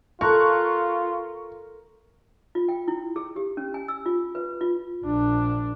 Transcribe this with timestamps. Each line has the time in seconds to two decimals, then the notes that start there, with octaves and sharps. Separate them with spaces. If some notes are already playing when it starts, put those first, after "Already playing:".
0.21 F4 A4 A#4 A5 C6 C#6 F#6
2.55 F4
2.69 G5
2.88 E4
3.16 G#4
3.36 G4
3.57 C#4
3.74 G#5
3.88 E6
4.06 F4
4.35 B4
4.61 F4
5.05 A#1 D4